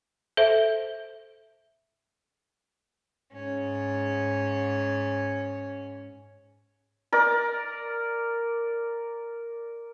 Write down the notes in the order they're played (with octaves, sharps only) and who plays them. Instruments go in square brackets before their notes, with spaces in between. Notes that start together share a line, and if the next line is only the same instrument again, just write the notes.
[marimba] A4 C5 E5
[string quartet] G#2 C#4
[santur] A#4 D5